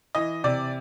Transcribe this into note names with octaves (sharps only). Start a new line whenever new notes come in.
E3 D#5
C3 D5